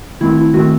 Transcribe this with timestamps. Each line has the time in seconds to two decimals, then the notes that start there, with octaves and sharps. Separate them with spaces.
0.21 D#3 A3 C4 E4
0.38 E4
0.54 D#3 A3 C4 F#4